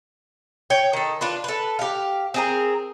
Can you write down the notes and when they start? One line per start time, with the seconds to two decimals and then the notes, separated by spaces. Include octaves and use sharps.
0.70 C#5 G5
0.93 D#3 A4
1.21 D4 F4 B4
1.44 A4 B4
1.79 G4 F5
2.34 C4 G#4 A#4